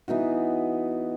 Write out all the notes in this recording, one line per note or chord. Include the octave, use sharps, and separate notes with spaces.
E3 B3 D#4 F#4